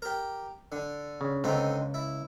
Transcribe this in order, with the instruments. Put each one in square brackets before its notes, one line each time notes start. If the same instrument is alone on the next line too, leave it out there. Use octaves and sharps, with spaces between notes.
[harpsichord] G4 A#4
D3
[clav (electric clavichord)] C#3
[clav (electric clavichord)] C#2 [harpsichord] D3 C4 D#4
[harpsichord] E4